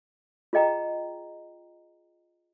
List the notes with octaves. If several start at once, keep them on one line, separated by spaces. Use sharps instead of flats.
F4 G#4 D#5 G5 A#5